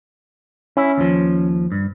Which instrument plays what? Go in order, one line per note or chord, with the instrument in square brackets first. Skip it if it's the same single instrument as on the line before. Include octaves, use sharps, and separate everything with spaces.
[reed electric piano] C#4 [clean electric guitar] E4
[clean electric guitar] D#2 F3
G2